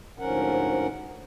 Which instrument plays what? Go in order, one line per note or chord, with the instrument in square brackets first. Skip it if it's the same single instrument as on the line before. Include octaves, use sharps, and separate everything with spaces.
[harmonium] D2 G#2 F3 C#4 A#4 F#5